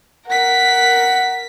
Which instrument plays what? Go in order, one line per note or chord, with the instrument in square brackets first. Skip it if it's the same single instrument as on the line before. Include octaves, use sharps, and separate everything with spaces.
[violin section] A#4 B6 [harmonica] F#5